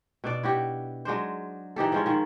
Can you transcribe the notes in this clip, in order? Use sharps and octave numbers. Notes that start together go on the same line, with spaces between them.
B2 D4 D5
E4 F#4 G4
F#3 G#3 D4 C5
E3 D#4 G4 A4
F3 G#3 C#4
D#3 F3